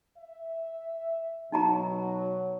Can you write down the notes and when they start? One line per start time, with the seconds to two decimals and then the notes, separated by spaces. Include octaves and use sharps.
0.18 E5
1.52 B2 F#3 D#4 A5 A#5